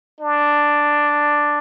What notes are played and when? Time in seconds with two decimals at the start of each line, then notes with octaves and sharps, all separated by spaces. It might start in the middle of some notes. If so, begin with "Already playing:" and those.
0.21 D4